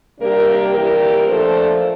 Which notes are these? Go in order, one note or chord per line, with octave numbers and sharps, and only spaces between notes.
C3 G3 A#3 D4 G4 A#4
C3 E3 G3 A#3 G4 A#4
A#2 F3 A3 D4 A4 C5